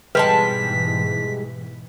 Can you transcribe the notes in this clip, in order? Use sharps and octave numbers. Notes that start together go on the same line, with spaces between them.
G#2 B2 E3 G3 G#3 B4 A5 B6